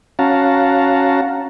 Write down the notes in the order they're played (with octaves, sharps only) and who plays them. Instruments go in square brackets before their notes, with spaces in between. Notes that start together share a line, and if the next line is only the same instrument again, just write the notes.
[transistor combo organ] C#4 F#4 F5 F#5 A5 A#5